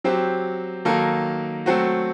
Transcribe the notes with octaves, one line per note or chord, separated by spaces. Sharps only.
F#3 C4 G4
D#3 F#3 A#3 D#4 A4
F#3 A3 C4 F#4